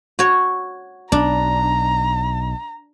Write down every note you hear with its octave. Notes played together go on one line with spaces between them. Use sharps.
F#4 C#5
B1 D4 A#5